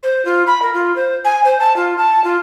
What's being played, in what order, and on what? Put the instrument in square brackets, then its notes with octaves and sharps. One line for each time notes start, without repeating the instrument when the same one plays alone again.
[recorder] C5
F4
B5
A#4
F4
C5
G#5
C5
A5
F4
A5
F4